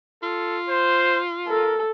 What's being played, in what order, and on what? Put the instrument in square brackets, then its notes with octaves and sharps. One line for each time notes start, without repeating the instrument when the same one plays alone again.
[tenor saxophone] F4 [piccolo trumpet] A4
[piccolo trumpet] C5
[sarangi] A4 [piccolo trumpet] A#4